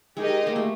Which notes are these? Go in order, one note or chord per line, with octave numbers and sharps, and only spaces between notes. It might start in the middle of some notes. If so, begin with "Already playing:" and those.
G#3 D#4 G4 A#4 D#5
A#3
A3